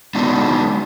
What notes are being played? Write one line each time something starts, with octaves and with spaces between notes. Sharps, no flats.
G#3 B3 D4 D#4 F#4